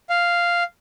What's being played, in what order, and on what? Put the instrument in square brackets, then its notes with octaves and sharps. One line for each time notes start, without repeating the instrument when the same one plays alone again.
[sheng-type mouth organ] F5